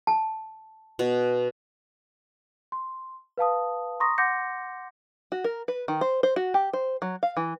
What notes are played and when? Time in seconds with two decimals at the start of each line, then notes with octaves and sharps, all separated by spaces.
0.07 A5
0.99 B2
2.72 C6
3.38 B4 F5 A5 D#6
4.00 A#5 C6 C#6 D#6 A#6
4.18 F#5 C6 D6 G6 A#6 C#7
5.32 F#4
5.44 A#4
5.68 B4
5.88 D#3
6.01 C5
6.23 C5
6.36 F#4
6.54 G4
6.73 C5
7.02 F#3
7.23 F5
7.37 E3